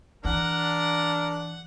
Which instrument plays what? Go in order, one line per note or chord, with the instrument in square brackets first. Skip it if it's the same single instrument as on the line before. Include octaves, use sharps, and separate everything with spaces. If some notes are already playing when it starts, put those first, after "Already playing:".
[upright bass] E3 [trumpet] D4 [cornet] A#4 [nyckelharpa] F#5